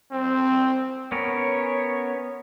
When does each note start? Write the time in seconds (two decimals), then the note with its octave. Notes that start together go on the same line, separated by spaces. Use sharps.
0.12 C4
1.12 B3 C#4 A#4 C#5